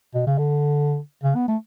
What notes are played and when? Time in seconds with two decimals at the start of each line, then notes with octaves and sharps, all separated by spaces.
0.14 B2
0.26 C#3
0.38 D3
1.23 C#3
1.35 B3
1.48 A3